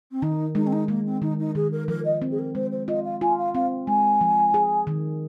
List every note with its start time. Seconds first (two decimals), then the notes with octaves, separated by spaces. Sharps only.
0.11 C4
0.22 D#3 D#4
0.55 G#3 D#4
0.67 C4
0.72 D#4
0.88 G#3 A#3
1.05 C4
1.22 D#3 D#4
1.39 D#4
1.55 D#3 G#4
1.72 A#4
1.88 F3 A#4
2.05 D#5
2.22 C4
2.31 G#4
2.39 A#4
2.55 G#3 C5
2.71 C5
2.88 F4 D#5
3.04 F5
3.21 F4 G#5
3.38 F5
3.54 C4 F5
3.87 G#3 G#5
4.21 F3
4.54 G#4
4.87 D#3